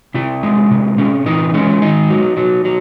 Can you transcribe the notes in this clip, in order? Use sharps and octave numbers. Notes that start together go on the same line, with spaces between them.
C3 E4
G#3
C3
C3 C#4
E3 D#4
G#3 C#4
D#3 D#4
F#3
F#3
F#3